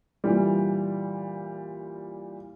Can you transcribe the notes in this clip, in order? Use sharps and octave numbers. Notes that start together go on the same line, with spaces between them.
A#2 E3 G3